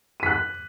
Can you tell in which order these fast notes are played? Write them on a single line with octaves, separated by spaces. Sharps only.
D#7 B6 F#6